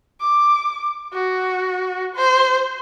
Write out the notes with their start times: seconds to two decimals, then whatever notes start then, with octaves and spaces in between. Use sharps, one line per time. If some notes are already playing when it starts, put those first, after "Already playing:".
0.21 D6
1.13 F#4
2.16 C5